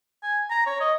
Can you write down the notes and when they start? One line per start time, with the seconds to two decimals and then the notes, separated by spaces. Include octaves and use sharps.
0.23 G#5
0.50 A#5
0.66 C#5
0.80 D#5